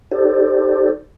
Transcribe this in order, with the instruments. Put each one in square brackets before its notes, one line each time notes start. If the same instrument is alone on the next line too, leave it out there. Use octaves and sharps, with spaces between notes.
[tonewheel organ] D#4 G4 A4 C5 D5